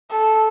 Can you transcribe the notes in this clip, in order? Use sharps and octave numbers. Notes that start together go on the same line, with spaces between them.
A4